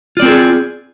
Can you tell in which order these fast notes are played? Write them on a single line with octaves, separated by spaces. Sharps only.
F4 D5 C4 A#4 G#4